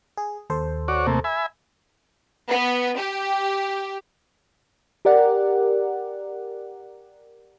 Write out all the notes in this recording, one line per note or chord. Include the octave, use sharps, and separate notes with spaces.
G#4
D#2 A4 C5
F#4 C#5 D5
C3 A3 A#3
E5 G#5 B5
B3
G4
G4 A#4 D5 F#5